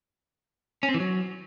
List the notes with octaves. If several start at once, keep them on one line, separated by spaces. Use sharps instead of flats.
C#4
C4
E3
F#3